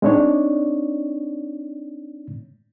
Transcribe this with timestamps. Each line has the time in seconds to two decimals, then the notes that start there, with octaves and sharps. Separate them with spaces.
0.02 G#3 C4 D4 D#4 C#5 D5